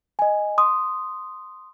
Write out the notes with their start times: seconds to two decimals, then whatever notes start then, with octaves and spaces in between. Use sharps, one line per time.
0.19 D#5 G#5
0.58 C6 D#6